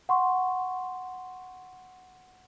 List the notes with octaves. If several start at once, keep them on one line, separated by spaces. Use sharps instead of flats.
F#5 C6 C#6